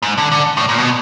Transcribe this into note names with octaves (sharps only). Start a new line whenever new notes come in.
G#2
D3
D3
A2
A#2
B2